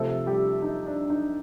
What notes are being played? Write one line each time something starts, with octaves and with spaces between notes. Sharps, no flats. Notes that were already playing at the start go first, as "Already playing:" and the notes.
Already playing: C3 F3 A3 A4
G3 G4
D#4
D4
D#4